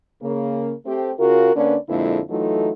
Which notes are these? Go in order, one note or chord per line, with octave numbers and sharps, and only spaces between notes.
C#3 A#3
A3 C4 G4
C#3 F4 F#4 A#4
D3 A#3 C#4 D4 B4 D5
F2 A#2 D3 G#3 A#3 E4
E3 F#3 A3 D#4 F4 A4